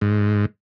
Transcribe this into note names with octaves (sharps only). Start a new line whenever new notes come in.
G#2